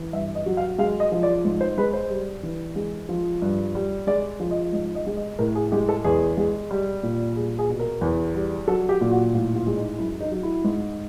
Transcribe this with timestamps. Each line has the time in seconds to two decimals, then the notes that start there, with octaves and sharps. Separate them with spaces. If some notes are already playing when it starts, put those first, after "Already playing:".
Already playing: E3
0.13 G2 E5
0.35 D#5
0.46 F#3
0.57 F5
0.78 G#3 F5
1.00 D#5
1.12 F3
1.23 D5
1.45 G#2
1.61 C5
1.77 G#3 B4
1.93 C5
2.10 G3
2.43 E3
2.76 G#3
3.09 F3
3.42 G2
3.75 G3
4.07 G#3 D5
4.40 F3
4.51 D#5
4.73 G#2 D#5
4.95 D#5
5.06 G#3
5.16 D#5
5.39 A2 A#4
5.55 G#4
5.72 G#3 G4
5.89 A4
6.04 E2 G#4
6.37 G#3
6.71 G3
7.03 A#2
7.36 G3 G#4
7.59 G#4
7.69 B2
7.79 A#4
8.01 E2
8.34 G3
8.67 F#3 A4
8.89 G4
9.01 A#2
9.11 F#4
9.34 A2 F4
9.55 F4
9.67 G#3
9.77 D#4
9.99 F#2 E4
10.20 D#4
10.31 F#3
10.43 E4
10.64 G#2